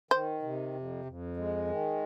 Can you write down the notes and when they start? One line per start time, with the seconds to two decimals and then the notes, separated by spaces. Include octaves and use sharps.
0.11 D#3 C5
0.42 C3
0.74 F2
1.05 F2
1.36 G#3
1.68 D#3